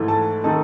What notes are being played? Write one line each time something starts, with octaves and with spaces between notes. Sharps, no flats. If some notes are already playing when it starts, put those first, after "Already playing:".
Already playing: G#2 E3 A3
A5
D#3 A3 D#4 A5